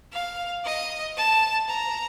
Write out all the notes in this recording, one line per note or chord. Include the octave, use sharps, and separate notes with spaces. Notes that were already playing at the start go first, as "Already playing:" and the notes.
F5
D#5
A5
A#5